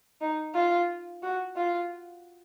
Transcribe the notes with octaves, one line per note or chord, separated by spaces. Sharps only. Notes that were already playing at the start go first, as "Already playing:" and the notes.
D#4
F4
F#4
F4